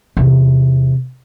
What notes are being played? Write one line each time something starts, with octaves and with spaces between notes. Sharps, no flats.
E2 C3